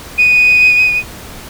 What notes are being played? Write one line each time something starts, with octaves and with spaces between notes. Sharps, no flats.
D#7